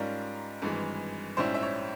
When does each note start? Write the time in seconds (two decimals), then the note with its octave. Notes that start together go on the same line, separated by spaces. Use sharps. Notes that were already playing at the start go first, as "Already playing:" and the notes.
Already playing: G#2 G3 C#4 F4 A#4
0.62 G#1 G2 E3 G#3
1.37 A#1 G#2 G3 C#4 E4 C5
1.54 E5
1.62 C#5